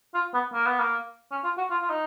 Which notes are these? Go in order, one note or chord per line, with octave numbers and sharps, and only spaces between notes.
F4
B3
A#3
B3
A#3
C#4
F4
F#4
F4
F4
D#4